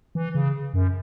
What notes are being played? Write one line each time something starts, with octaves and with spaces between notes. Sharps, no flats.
E3
C#3
F#2